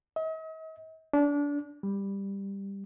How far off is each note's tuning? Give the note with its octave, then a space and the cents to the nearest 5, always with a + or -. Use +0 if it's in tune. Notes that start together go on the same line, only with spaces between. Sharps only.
D#5 +45
D4 -25
G3 +10